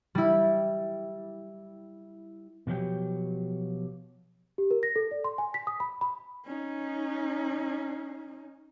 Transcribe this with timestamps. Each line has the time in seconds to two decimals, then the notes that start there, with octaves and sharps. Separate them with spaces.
0.15 G3 E4
2.67 B2 F3 F#3 G4
4.58 G4
4.71 A#4
4.83 A#6
4.96 A4
5.11 D5
5.24 C6
5.38 G#5
5.54 B6
5.67 D#6
5.80 B5
6.01 B5
6.45 C#4 D#4